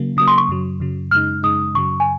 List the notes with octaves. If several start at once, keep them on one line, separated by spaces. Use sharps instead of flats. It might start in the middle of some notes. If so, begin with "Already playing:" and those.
Already playing: C#3 F#3 A#3
C#3 F#3 A#3 D#6
C6
C#6
F#2 C#3 F#3
F#2 C#3 F#3
F#2 C#3 G#3 D#4 F6
F#2 C#3 G#3 D#4 D#6
F#2 C#3 F#3 C#6
G#5